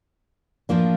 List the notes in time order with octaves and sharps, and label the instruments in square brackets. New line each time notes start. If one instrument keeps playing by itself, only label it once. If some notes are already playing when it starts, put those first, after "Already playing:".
[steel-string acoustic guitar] A2 F3 A#3 D4 F4